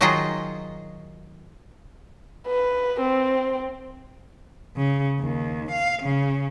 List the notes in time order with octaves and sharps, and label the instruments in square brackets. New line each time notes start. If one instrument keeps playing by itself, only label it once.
[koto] D#3 F#3 D#4 F4 G#4 D#5
[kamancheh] B4
C4
[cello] C#3
D#2
F5
C#3